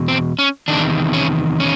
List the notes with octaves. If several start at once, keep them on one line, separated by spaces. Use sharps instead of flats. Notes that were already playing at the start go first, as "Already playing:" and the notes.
Already playing: E2 B2
C4
C#4
E2 C3 D#3 D4
C#4
C#4